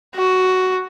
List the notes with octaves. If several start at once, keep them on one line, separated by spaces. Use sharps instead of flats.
F#4